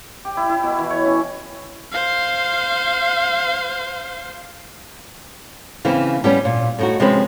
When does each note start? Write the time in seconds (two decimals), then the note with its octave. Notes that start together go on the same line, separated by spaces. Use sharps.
0.25 G4
0.37 E4
0.49 E4
0.63 B2
0.79 E3
0.90 C#5
1.05 C#4
1.92 C5 F5
5.85 C#3 E3 A#3 C4
6.24 G3 B3 C#4
6.45 A#2
6.79 A2 D#4 F#4
7.00 C3 F3 G#3 C4 C#4 B4